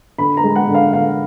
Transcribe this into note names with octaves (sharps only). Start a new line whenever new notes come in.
D3 B5
A#5
G#3
F#5
D3
F5
D3 F5